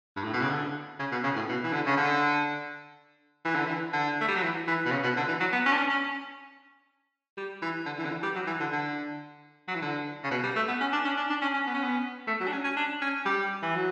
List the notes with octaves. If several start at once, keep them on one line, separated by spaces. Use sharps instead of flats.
G2
A2
B2
C#3
D3
C#3
B2
C#3
A2
B2
E3
D3
C#3
D3
E3
D3
E3
D3
A3
G3
F#3
E3
E3
B2
C#3
B2
D3
E3
F#3
B3
C#4
D4
C#4
C#4
G3
E3
D3
E3
D3
E3
G3
F#3
E3
D3
D3
F#3
E3
D3
C#3
B2
G3
A3
B3
C#4
D4
C#4
D4
D4
C#4
C#4
B3
C#4
B3
A3
F#3
D4
C#4
C#4
D4
C#4
G3
E3
F#3